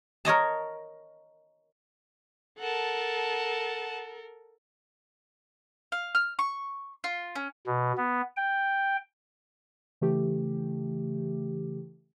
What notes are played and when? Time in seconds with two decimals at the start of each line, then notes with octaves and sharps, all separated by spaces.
0.25 A#4 C#5 D#5 A5
2.59 A4 A#4 F#5 A5
5.92 F5
6.15 F6
6.39 C#6
7.04 F4
7.35 C#4
7.67 B2
7.97 B3
8.36 G5
10.01 C#3 E3 A3 G4